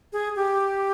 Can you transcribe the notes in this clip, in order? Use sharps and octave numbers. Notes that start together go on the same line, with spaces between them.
G#4
G4